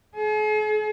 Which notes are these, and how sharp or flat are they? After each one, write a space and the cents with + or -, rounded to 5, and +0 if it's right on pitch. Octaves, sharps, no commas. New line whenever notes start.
G#4 +45